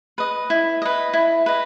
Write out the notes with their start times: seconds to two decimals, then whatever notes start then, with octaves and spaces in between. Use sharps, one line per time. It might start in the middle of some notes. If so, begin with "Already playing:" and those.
0.18 B4 D#5
0.50 E4
0.82 B4 D#5
1.13 E4
1.46 B4 D#5